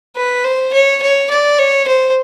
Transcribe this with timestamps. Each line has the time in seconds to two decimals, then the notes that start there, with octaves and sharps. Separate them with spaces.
0.16 B4
0.44 C5
0.73 C#5
1.02 C#5
1.30 D5
1.59 C#5
1.87 C5